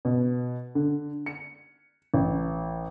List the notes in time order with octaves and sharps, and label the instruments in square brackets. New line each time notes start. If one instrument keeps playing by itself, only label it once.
[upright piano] B2
D3
C#7
A1